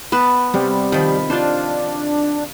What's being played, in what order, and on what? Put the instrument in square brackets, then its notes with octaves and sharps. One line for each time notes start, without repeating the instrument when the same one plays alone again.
[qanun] B3 B4 A5
[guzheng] C3 [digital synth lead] G3
[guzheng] D#3 F3 [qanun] B5
[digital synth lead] D4 [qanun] F4 C5